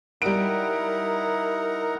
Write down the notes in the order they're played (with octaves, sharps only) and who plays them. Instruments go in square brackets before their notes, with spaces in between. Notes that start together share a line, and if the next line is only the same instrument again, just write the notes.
[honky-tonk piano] G3 D7 [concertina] D#4 E4 F#5 [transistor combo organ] A#4